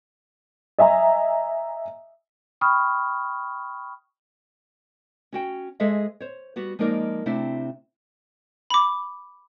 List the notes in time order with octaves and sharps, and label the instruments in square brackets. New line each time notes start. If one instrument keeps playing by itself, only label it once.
[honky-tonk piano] D#5 E5 G#5 A#5
[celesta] G5 B5 C#6 D#6 F6
[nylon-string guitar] C#4 F#4 G5
G#3 G#4 A4 C5 D#5 E5
C5 C#5
G3 B3 F#4
F3 G#3 A#3 D#4 A#4 D5
C3 A3 C4 D4 E4
[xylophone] B5 D6